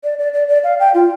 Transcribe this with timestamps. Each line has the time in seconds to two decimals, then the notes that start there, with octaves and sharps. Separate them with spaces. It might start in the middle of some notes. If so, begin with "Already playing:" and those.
0.04 D5
0.19 D5
0.33 D5
0.48 D5
0.64 F5
0.80 G5
0.94 F4